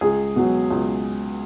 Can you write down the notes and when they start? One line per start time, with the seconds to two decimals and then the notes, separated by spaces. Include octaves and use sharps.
0.01 C#2 G#4
0.36 B2 F#3
0.71 C#2